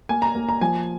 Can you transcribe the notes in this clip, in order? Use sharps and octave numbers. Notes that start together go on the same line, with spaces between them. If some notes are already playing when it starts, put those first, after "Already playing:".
A#3 G#5
A#5
A#3
A#5
F3 G#5